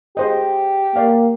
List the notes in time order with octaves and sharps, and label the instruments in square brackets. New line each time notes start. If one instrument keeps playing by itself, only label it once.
[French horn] G4 [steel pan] G#4 C5 D#5
[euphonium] A#3 [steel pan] D5 F5